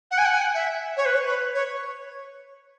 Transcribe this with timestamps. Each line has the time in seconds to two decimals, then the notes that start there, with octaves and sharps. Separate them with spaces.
0.11 F#5
0.18 G#5
0.25 F#5
0.33 G#5
0.41 F#5
0.54 E5
0.97 C#5
1.06 B4
1.14 C#5
1.26 B4
1.55 C#5